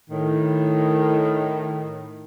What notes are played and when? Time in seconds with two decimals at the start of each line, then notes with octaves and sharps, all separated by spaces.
0.10 A2 D#3